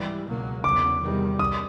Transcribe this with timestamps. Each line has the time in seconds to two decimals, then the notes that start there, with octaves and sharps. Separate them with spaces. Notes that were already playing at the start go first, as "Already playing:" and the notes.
Already playing: G#2 E3 G3
0.27 C#2 B2 F#3 A#3
0.64 E2 C#3 F#3 D6
1.02 E2 C3 D#3 G3
1.39 D#6